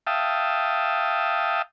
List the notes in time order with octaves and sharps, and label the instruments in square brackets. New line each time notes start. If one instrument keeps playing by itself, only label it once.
[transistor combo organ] E5 F5 G5 A5 D#6